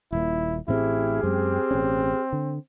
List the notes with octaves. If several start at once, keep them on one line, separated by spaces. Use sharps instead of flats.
D#1 A#2 E4
A1 A2 C4 E4 G4 G#4 F6
F#2 G#3 C4
A1 B2 C#4
D3